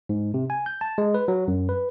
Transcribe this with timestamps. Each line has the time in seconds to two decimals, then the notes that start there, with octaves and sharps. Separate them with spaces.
0.09 G#2
0.34 C3
0.50 G#5
0.66 G6
0.81 A5
0.98 G#3
1.14 B4
1.28 F#3
1.48 F#2
1.69 B4